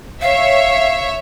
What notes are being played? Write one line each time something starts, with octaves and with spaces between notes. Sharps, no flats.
C#5 E5 F5